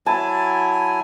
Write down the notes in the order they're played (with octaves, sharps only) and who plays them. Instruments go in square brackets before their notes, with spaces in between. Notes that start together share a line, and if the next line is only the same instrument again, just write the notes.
[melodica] F#3 E4 G#5 [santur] A5